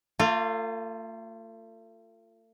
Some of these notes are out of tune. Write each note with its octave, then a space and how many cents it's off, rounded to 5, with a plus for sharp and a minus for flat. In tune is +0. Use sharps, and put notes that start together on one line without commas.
A3 +40 F4 +0